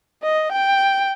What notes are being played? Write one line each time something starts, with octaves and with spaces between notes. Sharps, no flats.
D#5
G5